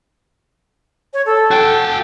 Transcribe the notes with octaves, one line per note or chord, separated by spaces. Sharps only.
C#5
A4
F#4 G5